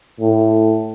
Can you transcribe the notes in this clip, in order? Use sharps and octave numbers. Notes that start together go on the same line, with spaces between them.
A2